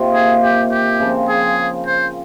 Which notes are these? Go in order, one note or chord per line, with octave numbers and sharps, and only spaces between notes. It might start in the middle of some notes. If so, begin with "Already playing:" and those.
Already playing: C3 D#3 A#3 F4
G#4
G4
G4
C#3 F3 C4
G#4
C5